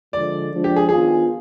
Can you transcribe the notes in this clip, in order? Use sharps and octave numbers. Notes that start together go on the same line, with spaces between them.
D3 F3 G#3 D5
F3 G#3 D4
G4
G#4
D#3 B3 D4 F4 G#4